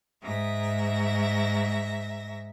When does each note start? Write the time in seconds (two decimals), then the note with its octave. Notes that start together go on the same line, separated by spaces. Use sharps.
0.23 G#2 E5 A#6